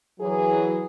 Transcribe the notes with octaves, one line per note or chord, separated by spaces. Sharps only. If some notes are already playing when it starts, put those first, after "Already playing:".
E3 F#3 G#4